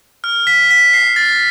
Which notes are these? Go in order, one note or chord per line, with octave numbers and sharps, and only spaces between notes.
F6
B6
B6
C7
A6